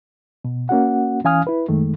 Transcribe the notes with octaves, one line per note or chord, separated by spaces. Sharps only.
B2
A#3 C#4 F#4 F#5
E3 C#4 F5 G#5 D#6 F6
E4 B4
F#2 D#3 G#3 A3